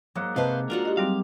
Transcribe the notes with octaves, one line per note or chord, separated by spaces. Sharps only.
G#2 F#3 A#3 F#5
C3 B4 C5 D#5 F5 A5
D4 F4 F#4 A#4
G4 D#5
F#3 G3 C4 G4 F5